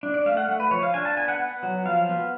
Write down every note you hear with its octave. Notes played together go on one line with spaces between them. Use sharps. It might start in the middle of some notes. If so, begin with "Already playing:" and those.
D4
D5
A3 F5
F#5
A3
B4
F3 C#5
F5
D4 G#5
A5
B3 G#5
F#5
B3
F#3
F3 F5
B3